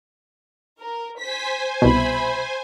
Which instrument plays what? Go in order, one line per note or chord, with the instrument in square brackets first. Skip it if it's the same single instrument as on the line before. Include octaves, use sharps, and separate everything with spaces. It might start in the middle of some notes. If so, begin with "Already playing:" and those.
[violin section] A#4
[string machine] C5 G#5 [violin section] B6
[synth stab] C2 B2 [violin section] E5 B5